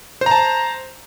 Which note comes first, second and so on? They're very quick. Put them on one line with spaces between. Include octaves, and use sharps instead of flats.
C5 A#5 A5